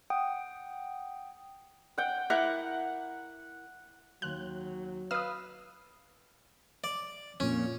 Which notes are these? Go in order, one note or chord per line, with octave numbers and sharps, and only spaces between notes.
F#5 G5 D#6
F#5 G5
E4 A#4 F#5 D6
D#2 F#3 C6 F#6 F7
B4 D#5 F5 D#6 E6
D5
F2 A#2 C#4